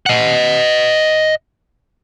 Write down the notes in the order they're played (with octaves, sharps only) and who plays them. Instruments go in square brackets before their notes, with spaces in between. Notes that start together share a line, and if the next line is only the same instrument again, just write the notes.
[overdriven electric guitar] D#5 F#5